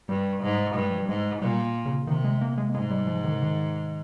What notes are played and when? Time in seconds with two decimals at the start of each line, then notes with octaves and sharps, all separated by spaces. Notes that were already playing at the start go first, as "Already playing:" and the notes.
0.09 G2 G3
0.43 G#2
0.75 G2 G#3
0.90 F3
0.99 G3
1.09 G#2 G#3
1.41 A#2 G3
1.85 C#3
2.07 C3 D#3
2.24 G#3
2.41 A#3
2.58 G#3
2.69 A#3
2.74 G#2 G#3
2.90 G3
3.07 F3
3.24 D#3
3.33 C#3
3.42 D#3